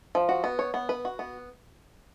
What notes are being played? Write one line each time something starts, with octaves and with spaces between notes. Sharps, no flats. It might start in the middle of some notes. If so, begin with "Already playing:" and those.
F3
F#4
B3
C#5
B3
B4
F#4
B3